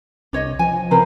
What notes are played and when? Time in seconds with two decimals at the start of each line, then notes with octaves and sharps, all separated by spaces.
0.33 C2 D4 C#5 D#5
0.59 F3 G#5
0.91 C3 E4 A#4 C5 A#5